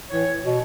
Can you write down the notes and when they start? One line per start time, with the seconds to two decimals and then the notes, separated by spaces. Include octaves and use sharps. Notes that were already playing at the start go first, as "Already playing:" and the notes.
0.10 A2 E3 C#5
0.45 B2